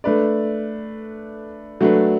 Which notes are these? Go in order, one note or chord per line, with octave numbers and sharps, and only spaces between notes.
A3 D4 B4 D5
F#3 A3 D4 B4